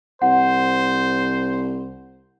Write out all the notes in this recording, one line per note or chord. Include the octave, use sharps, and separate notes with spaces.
C2 C5 F#5